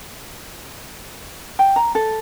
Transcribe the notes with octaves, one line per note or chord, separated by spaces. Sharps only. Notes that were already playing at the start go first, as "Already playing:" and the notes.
G5
A#5
A4